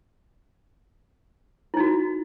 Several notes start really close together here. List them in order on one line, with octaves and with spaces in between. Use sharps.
E4 D#4 F#4